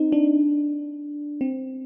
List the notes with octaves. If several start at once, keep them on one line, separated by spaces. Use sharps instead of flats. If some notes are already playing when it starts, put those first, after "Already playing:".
Already playing: C4 D#4
D4
C4